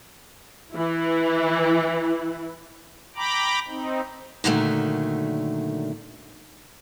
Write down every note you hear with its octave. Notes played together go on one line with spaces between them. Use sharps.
E3 E4
G5 A#5 B5 D6
C4 D#4
A#2 D3 D#3 F#3 G3 A3